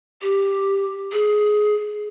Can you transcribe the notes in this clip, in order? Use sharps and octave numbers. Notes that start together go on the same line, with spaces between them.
G4
G#4